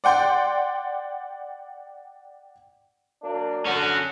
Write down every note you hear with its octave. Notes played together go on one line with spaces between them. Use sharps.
D5 F#5 G5 C6
F#3 A#3 D4
D3 C#4 F#4